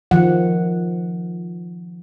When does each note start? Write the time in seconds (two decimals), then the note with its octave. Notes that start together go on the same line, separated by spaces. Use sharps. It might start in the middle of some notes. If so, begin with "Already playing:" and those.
0.11 D#3 F3 F#5